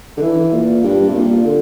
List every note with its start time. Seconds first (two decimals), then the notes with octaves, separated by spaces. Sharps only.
0.17 D3
0.22 E3
0.52 A#2
0.83 G2
1.08 C3
1.14 A#2
1.44 D3